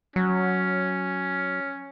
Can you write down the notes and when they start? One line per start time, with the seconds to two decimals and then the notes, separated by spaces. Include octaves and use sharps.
0.16 F#3 C#4